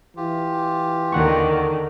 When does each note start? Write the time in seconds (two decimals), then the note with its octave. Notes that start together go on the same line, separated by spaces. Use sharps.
0.17 E3 F4 G4
1.12 D#2 D3 D#3 F#5 C#6